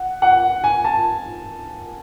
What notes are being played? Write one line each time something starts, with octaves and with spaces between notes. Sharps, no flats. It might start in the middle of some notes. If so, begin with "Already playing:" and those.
Already playing: F#5
F#5
G#5
A5